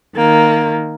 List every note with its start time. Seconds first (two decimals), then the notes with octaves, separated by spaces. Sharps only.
0.16 D#3 A#3